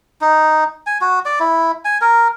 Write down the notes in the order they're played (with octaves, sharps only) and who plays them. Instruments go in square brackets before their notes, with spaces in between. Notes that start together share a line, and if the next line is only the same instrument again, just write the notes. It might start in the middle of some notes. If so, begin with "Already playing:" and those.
[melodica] D#4
G#5
F#4
D5
E4
G#5
A#4